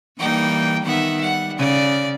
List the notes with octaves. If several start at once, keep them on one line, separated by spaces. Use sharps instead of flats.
E3 G3 A#3 D#4 G5
D#3 B3 E5 F#5
G3 F#5
C#3 D5